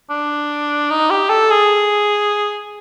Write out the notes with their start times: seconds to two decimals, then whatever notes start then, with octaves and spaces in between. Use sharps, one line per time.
0.10 D4
0.91 D#4
1.10 G4
1.30 A4
1.51 G#4